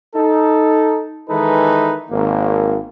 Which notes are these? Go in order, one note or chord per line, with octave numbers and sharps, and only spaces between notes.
D#4 A4
D#3 E3 G#3 D#4 A4 B4
G#1 A#3